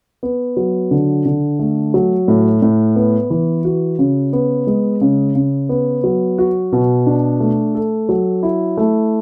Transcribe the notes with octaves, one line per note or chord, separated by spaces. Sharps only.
B3
F#3
D3
D3
A3
F#3
A2
A2
B3
E3
F#4
C#3
B3
G#3
C#3
C#3
B3
F#3
F#4
B2
D4
A3
A4
F#3
E4
A3